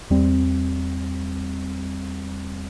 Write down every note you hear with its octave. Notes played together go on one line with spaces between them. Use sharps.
E2 G3 C4